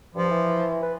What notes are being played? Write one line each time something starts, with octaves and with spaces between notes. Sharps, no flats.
G2 F3
E3
B4